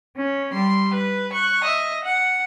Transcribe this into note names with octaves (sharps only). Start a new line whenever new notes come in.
C#4
G3 C6
B4
C#6 F#6
D#5 E5
F#5